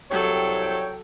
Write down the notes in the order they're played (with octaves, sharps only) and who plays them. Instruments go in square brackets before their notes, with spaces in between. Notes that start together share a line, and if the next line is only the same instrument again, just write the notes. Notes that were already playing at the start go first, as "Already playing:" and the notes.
[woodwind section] C2 G5 [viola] F#3 A4 [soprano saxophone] C#5